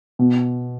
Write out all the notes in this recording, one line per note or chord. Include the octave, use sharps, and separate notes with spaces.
B2